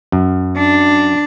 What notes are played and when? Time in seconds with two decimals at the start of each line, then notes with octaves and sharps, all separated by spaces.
0.12 F#2
0.57 D4